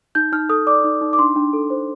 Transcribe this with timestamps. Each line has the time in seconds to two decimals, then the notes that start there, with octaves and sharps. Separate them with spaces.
0.15 D#4 G6
0.32 D#4 F6
0.49 A4 D#6
0.67 D5 D6
0.84 D#4
1.01 D#4
1.13 D6
1.19 D4 C6
1.36 D4
1.53 A4
1.70 C5